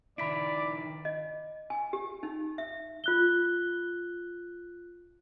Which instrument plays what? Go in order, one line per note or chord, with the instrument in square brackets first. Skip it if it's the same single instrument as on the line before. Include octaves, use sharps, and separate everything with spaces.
[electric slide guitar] D#3 E4 [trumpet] D5 [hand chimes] B5 B6 D7
[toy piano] D#5
G#5
G4
D#4
E5
[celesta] F4 F#6 G7